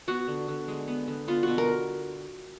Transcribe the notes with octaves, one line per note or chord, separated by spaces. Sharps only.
B3 F#4
D3
D3
G#3
B3
D3
B3 F4
B2 F#4
A#4